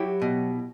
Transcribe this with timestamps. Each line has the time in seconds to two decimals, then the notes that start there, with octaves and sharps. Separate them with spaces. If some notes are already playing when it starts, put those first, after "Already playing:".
Already playing: F#3 E4 G4
0.22 B2